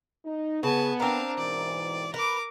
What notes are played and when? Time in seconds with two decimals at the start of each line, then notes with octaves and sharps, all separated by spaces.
0.25 D#4
0.63 C#3 B3 G#5 A5
1.00 C4 D4 A#4 F5
1.38 G#2 B2 E3 D5
2.14 A#4 B4 D6